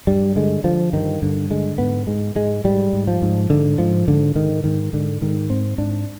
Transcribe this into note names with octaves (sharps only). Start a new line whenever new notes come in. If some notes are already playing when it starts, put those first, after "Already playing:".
G2 G3
D3 G#3
D3 F3
G2 D#3
G2 D3
D3 G#3
G#2 B3
G#2 G#3
G#2 G#3
G#2 G3
G#2
F3
G#2
G#2 D3
G#2 F3
G#2 D3
G#2 D#3
G#2 D#3
G#2 D3
G#2 D#3
G#2 C4
G#2 D4